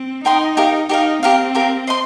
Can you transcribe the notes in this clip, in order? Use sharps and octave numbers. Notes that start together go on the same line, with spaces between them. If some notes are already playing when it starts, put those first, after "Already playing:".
Already playing: C4
D#4 A#4 G5 C6 D#6
G4 A#4 F5
D#4 G4 A#4 F5
C4 G4 A#4 F5
G4 A#4 F5
C5 D#5 C6